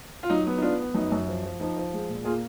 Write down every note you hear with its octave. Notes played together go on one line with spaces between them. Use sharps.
F4
F#3 D#4
B3
D#4
B3 D4 F4
B3
F#2 D#4
F#2
F3
F3
F3 D#4
F3
G#3
A#2
A#3 F4 G#4